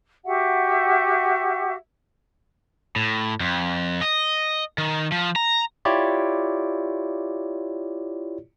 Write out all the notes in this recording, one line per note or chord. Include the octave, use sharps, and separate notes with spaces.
F#4 G4 E5 F#5
A2
F2
D#5
D#3
F3
A#5
E4 F4 G4 C#5 D5